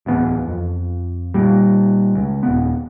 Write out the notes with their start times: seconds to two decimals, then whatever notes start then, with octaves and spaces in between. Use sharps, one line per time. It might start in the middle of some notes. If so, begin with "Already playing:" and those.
0.06 D1 E2 B3
0.48 F2
1.34 A#2 G3
2.15 C#2
2.43 D#1 B3